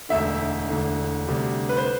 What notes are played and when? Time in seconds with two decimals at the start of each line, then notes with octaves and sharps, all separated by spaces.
0.09 E1 D2 D3 E5
0.27 E5
0.69 E1 D2 D3
1.27 D2 C3 G3
1.69 B4
1.77 C5